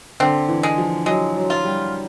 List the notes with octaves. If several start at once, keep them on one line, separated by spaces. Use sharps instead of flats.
D3 C4
E3
G#3
F3
F#3 G#3
F#3
F4
G3